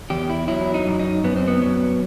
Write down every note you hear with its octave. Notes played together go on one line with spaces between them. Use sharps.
E2 G4
E4
F#3 E4
D#4
F#2
D#4
F#2 B3
C4
B3
F#3